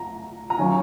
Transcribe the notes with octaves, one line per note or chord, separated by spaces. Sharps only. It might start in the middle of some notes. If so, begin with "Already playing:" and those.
Already playing: A#5
A#5
D#3 F#3 C#4 F4 G#5